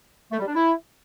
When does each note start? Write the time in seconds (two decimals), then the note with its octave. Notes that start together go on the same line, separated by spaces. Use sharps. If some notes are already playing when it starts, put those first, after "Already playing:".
0.32 A3
0.40 G3
0.47 D4
0.55 E4